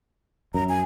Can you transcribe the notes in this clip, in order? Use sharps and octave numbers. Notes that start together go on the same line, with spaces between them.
F#2 A#5
G#5